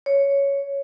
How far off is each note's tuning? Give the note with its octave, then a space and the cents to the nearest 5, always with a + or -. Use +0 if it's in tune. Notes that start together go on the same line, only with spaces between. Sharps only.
C#5 +5